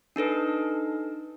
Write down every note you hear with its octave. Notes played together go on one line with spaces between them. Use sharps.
D4 D#4 A4 B4